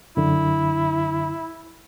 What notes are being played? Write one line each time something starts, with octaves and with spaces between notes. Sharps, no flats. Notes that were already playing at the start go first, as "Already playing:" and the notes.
F#2 D3 E4